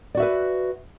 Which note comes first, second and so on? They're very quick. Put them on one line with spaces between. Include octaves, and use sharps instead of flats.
D5 F#4 E5 B4